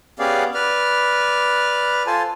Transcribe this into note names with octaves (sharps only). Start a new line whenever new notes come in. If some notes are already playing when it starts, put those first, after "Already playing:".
B3 C#4 G4 G#4 D5 F5
B4 D5 F6
F4 A4 C5 G#5 A5